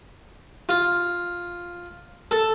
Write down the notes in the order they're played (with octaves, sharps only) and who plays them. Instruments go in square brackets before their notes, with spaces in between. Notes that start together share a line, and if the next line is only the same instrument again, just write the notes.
[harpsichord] F4
A4